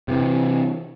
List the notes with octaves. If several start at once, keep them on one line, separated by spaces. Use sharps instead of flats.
C3 E3